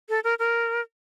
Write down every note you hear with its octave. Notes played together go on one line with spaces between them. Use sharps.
A4
A#4
A#4